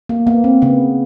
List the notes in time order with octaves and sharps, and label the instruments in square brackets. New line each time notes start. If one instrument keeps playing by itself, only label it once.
[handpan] A#3
A#3 B3
C4
C#3 B3